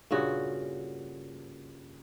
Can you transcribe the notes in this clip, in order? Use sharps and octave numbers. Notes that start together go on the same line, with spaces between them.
G2 A#2 C#3 F#4